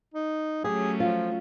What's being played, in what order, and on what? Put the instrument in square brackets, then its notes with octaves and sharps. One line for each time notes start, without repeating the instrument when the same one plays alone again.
[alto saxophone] D#4
[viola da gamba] F#3 A3 C#4 [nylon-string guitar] G4 [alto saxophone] G#4
[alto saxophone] F3 [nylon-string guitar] F4